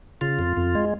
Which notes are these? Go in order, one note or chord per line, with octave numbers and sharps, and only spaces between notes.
C#3 F4
F2
F2
G#3